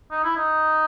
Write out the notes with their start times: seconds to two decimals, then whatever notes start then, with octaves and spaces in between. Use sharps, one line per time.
0.11 D#4
0.24 E4
0.37 D#4